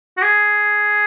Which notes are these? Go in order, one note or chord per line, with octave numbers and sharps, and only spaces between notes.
F#4
G#4